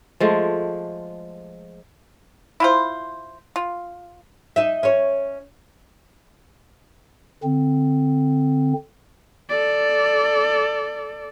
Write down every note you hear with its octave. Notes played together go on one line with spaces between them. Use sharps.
F3 G#3 A3
E4 F4 C5
F4
D#4 E5
C#4 C#5
D3 C4
A4 D5